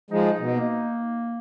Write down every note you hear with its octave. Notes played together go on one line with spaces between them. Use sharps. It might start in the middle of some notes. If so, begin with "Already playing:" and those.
F3 G#3 D#4
B2
A#3